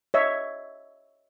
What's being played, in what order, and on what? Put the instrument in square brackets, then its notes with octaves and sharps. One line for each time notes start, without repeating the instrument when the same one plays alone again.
[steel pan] C#5 D#5 E5